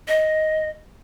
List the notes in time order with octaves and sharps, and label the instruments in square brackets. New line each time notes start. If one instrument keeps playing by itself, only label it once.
[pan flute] D#5